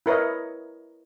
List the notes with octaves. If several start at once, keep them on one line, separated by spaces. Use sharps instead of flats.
E4 A#4 B4 C#5 D#5